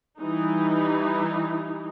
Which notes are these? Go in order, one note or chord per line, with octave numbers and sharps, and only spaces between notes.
E3 G3 D#4